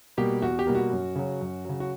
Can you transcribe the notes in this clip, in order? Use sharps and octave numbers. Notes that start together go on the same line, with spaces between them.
B2 G3 A#3 G4
E2 F#4
G4
B2 G3 A#3
F#4
F#2
C#3 F#3
F#2
C#3 F#3
F#4